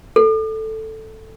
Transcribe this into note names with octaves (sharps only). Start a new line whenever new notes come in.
A4